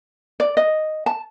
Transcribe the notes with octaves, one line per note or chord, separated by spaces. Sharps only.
D5
D#5
A5